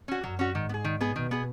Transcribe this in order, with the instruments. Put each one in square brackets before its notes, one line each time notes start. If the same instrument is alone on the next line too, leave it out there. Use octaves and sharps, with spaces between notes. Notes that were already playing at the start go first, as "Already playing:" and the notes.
[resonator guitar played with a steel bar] C#4 F#4
[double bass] F#2 [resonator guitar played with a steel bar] F#3
[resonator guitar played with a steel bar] C#4 F#4
[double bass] G#2 [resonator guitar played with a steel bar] D#3
[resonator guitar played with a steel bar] B3
G#4
D#3
B3 G#4
[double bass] B2 [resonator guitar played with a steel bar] D#3
[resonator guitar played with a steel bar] B3 G#4